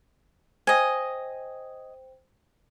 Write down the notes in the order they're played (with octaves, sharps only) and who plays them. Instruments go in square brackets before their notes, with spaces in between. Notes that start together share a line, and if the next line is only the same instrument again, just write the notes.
[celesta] C5 G5 [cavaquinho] D#5 G#5